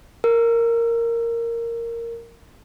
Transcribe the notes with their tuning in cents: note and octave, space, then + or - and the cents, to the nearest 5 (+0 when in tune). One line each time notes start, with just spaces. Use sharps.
A#4 -10